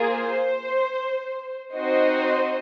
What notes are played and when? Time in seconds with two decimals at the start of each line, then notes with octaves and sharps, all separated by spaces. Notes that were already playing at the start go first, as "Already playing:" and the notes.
Already playing: A#3 F4 G#4
0.09 C5
1.75 C4 D#4 F#4 C5 D#5